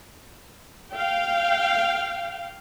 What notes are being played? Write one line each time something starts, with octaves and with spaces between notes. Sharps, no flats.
F5 G5